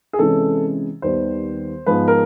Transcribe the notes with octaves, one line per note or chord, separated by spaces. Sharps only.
G#4
C3 E3 G#3 C#4 A4
D#2 D#3 G3 B3 C5
G#2 F3 G#3 B3 B4
A#4